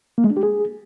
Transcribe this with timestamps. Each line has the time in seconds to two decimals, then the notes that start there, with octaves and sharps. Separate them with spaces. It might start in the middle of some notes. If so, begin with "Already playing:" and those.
0.18 A#3
0.24 G#3
0.30 D4
0.37 G4
0.43 G#4